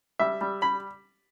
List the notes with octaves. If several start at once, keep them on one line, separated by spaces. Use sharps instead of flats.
G3 E5
G3
B5